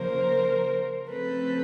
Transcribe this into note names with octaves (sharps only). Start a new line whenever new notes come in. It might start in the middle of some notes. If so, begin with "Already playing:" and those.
Already playing: C#3 F3 A#3 A#4 C5
C#3 F3 A3 C4 A4 B4